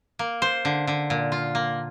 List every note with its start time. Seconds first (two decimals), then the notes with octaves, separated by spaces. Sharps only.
0.19 A#3
0.42 C5
0.65 D3
0.87 D3
1.10 A#2
1.32 F4
1.55 A#3